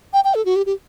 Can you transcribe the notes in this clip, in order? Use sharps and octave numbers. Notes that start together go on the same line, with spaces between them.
G5
G5
A4
F#4
G4
G4